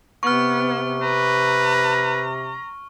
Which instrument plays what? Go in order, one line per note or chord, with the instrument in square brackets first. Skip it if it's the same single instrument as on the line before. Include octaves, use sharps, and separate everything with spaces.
[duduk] C3 [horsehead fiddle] B3 [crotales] C#6 F6
[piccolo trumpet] B4 [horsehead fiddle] A#5